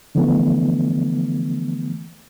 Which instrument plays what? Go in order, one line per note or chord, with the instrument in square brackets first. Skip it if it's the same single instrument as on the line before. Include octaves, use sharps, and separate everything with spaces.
[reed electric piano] D3 E3 F3 A3 B3